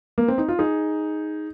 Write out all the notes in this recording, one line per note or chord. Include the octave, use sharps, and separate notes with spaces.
A#3
C4
D#4
F4
D#4 G#4